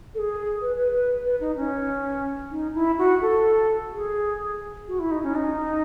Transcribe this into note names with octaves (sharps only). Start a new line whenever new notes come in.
A4
G#4
B4
B4
B4
B4
D#4
C#4
D#4
E4
F#4
A4
G#4
F#4
E4
D#4
C#4
D#4